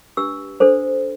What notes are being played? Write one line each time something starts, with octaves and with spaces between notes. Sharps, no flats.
D4 G4 B4 E6
D4 A4 C5